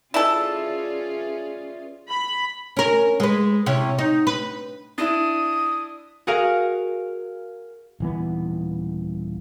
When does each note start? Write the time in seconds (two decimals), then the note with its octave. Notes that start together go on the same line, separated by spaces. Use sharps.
0.14 C#4 E4 F4 G#4 A4 B4 D5 E5
2.09 B5
2.77 C#4 A#4
3.20 G#3 B4
3.66 C3 C#4 E4
3.99 D#4
4.27 B4
4.98 D4 E4 D#6
6.27 F#4 G#4 A#4 F5
8.00 D#1 E3 B3